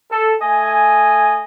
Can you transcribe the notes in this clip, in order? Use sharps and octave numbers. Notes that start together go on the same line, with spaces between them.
A4
A3 D#5 G#5